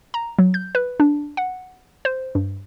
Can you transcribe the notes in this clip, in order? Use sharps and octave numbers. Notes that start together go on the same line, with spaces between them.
A#5
F#3
G6
B4
D4
F#5
C5
G2